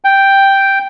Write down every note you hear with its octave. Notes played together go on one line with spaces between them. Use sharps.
G5